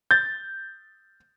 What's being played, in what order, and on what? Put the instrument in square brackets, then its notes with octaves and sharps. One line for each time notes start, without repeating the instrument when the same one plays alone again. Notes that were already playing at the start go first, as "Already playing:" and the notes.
[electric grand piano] G6 A6